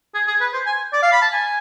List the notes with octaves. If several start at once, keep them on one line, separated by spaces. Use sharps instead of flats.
G#4
G#4
B4
C5
G#5
D5
F5
B5
A5
G#5